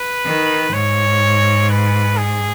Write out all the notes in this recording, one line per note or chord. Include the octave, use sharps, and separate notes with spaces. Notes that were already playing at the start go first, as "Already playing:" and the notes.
Already playing: B4
D#3
G#2 C#5
B4
G#4